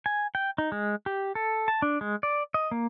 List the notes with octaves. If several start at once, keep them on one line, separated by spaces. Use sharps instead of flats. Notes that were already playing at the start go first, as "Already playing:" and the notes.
G#5
G5
D#4
G#3
G4
A4
A5
D4
G#3
D5
D#5
A#3